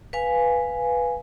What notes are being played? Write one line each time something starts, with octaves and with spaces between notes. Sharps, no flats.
B4 F5 G#5